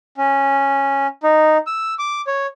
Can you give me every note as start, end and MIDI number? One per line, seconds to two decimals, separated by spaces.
0.18 1.07 61
1.23 1.58 63
1.67 1.94 88
1.99 2.21 86
2.27 2.47 73